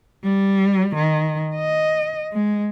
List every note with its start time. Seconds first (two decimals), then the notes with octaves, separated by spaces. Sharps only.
0.24 G3
0.95 D#3
1.55 D#5
2.33 G#3